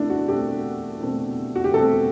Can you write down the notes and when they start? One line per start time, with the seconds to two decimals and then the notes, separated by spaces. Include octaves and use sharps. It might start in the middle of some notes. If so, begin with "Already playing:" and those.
Already playing: B2 A3 C4 D4 E4
0.10 F#4
0.28 B2 A3 C4 G4
1.01 B2 A3 C4
1.56 F#4
1.64 G4
1.73 B2 A3 C4 A4